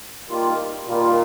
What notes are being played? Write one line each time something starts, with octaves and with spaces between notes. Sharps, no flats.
D#3 G3 A#3 F4
A#2 D#3 G3 A#3 F4